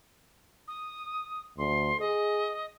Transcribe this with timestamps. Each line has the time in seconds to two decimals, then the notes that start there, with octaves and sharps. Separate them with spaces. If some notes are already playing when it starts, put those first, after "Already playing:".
0.68 D#6
1.58 D2 C6
2.00 G#4 D#5